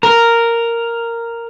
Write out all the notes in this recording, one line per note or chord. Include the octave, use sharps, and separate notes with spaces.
A#4